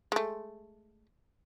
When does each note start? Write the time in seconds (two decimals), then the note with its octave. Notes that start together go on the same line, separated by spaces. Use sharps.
0.12 G#3 A3